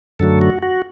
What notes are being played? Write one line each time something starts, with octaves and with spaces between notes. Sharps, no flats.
F#2 D3 F#3 A3 A4
F#4
F#4